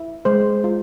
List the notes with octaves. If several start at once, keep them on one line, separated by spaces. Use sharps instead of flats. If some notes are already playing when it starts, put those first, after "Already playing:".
Already playing: E4
G#3 C5
F4